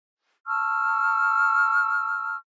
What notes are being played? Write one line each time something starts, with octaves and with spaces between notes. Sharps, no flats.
A5 C#6 E6 F6